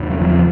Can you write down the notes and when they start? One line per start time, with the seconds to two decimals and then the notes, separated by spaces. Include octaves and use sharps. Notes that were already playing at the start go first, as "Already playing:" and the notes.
Already playing: E2 C#3
0.09 F#3
0.22 F3